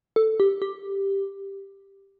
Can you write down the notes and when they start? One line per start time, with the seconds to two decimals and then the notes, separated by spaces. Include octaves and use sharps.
0.16 A4
0.40 G4
0.62 G4